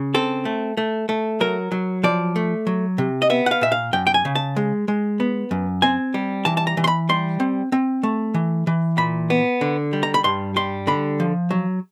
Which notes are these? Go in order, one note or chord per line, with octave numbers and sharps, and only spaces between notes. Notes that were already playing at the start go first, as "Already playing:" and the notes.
Already playing: C#3
C4 A4
A3
A3
A3
F#3 A#4
F#3
F3 D5
A3
F#3
C3
D#5
B3 E5
F#5
F5
A#2 E5
F5
F#2 G5
G5
G#5
C#3
A5
G#3
G#3
B3
F#2
C4 G#5
G3
E3 A5
A5
A#5
E3
C6
B5
G3 C6
C4
C4
A3
E3
E3
A#2 B5
B3
D3
G3
A#5
B5
G2 C6
G3 C6
D3 B5
F3
F#3